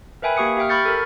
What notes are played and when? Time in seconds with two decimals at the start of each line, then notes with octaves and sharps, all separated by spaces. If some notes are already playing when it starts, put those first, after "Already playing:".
0.22 A#4 B4 E5 G5 G#5 B5
0.37 A#3 G4 C#6 D#6 C#7
0.57 G4 E5 G5 F6
0.69 B5 C#6 F6 G6 A6 C#7
0.85 A4 A#4